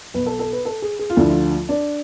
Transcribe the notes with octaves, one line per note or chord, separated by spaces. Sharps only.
B1 B2 B4
A4
A4
B4
A4
G#4
G#4
F4
D2 D3 F3 E4
F4
D4